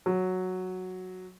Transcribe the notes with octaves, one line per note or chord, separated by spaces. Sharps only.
F#3